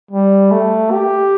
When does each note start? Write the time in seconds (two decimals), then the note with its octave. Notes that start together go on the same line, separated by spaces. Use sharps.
0.11 G3
0.51 A3
0.91 G4